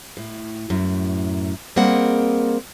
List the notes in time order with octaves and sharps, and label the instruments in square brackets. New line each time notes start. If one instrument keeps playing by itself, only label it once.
[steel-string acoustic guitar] A2
F#2 A2
G3 A#3 C4 G#4 A#4 F#5